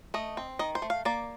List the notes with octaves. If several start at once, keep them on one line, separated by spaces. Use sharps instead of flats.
A3 D#5
C4
D#3 D#5
C5
A3
F5
A#3 D5